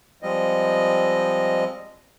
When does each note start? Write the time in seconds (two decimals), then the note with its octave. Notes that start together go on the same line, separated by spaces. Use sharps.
0.23 F3 G3 G#3 C4 D#5